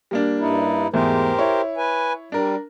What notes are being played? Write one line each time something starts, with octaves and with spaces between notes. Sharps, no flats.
G3 A#3 D4
G2 D#4 E4
E2 G#2 A3 G4 A#4 C5
E4 C#5
B4 G#5
G3 D4 A#4